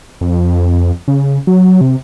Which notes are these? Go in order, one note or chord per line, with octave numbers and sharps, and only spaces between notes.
F2
C#3
F#3
C3